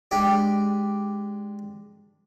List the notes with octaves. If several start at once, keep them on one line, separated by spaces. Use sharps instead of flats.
G#3 D4 G4